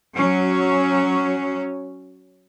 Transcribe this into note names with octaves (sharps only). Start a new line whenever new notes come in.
F#3 C#4